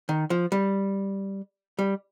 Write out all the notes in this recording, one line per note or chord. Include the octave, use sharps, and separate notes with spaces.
D#3
F3
G3
G3